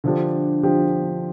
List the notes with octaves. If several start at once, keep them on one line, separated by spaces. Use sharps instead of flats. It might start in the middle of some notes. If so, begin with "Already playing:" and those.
D3 F3 D4 G4
D3 F3 D4 G4